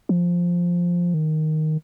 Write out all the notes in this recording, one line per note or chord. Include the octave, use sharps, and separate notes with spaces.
F3
D#3